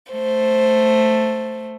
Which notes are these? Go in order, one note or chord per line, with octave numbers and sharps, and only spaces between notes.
A3 C5